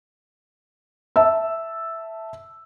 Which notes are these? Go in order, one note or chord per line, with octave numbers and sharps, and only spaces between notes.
E5 A5 E6